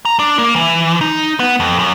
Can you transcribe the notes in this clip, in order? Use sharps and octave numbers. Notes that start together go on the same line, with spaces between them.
A#5
D4
A#3
E3
D#4
B3
F2
F#2